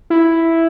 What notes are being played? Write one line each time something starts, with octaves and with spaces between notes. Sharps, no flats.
E4